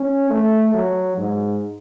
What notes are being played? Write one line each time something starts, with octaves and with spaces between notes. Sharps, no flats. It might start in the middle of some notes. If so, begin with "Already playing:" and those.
Already playing: C#4
A3
F#3
G#2